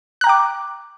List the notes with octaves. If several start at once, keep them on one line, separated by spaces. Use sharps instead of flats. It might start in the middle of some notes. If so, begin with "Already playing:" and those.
G5 A#5 D6 F#6